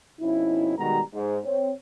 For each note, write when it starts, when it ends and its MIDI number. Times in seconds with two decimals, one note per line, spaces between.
0.20 0.74 41
0.20 0.74 47
0.20 0.74 61
0.20 0.74 63
0.20 0.74 64
0.78 1.01 47
0.78 1.01 51
0.78 1.01 55
0.78 1.01 56
0.78 1.01 66
0.78 1.01 82
1.14 1.39 44
1.45 1.73 60
1.45 1.73 73